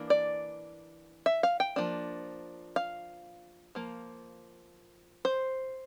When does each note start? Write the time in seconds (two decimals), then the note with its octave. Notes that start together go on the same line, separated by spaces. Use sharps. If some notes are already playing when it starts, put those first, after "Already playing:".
Already playing: E3 A#3 D4
0.10 D5
1.26 E5
1.43 F5
1.60 G5
1.76 F3 A#3 D4
2.76 F5
3.75 F3 A#3
5.25 C5